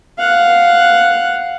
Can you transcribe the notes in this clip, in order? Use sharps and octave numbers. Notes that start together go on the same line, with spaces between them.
F5 F#5